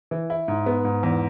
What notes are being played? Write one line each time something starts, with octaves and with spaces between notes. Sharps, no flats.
E3
E4
G#2
B3
G#2
E2